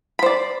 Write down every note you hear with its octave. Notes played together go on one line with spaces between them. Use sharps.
C5 D5 B5